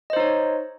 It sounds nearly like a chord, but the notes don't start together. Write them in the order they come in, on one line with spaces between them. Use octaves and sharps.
D#5 C5 D#4 C#5